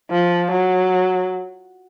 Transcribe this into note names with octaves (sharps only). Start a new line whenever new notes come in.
F3
F#3